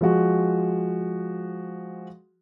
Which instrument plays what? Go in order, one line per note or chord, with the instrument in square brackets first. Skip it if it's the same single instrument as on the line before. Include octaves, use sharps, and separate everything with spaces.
[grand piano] F3 G#3 F#4